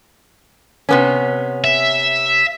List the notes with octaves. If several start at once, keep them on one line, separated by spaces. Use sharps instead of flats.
C3 B3 C#4
E5